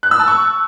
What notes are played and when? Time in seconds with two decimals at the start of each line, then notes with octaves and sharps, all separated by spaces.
0.03 F#6
0.11 E6
0.19 A5
0.28 C#6